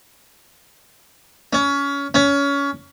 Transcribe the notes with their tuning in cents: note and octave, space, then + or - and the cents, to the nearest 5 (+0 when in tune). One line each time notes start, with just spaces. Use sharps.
C#4 +25
C#4 +25